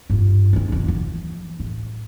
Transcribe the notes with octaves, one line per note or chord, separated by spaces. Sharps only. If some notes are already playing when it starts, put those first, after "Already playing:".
G2 F4
C4 C#4
E1 F2
E3 F3
A1